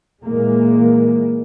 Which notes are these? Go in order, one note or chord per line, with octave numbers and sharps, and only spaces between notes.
A#2 E3 G#3 A#3